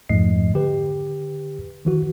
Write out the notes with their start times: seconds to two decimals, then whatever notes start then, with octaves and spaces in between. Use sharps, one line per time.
0.09 F2 G#2 F3 A3 D#5 C7
0.54 D3 G4 B4
1.85 D#3 E3 F#4